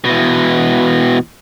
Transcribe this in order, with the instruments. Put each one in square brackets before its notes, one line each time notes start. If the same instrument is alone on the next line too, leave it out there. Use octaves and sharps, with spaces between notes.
[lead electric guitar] B2 E3